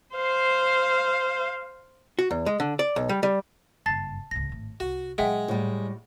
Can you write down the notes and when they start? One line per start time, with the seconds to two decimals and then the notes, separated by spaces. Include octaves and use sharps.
0.16 C5 F5
2.19 F#4
2.31 E2
2.46 G#3
2.60 D3
2.79 D5
2.96 B1
3.09 G3
3.23 G3
3.86 F#1 G2 A5 A6 C7
4.31 G#1 C#2 A#6
4.49 G#1 A2
4.80 C2 F#4
5.18 A#2 F#3 G#3 E5 F#5 G5
5.48 A2 G3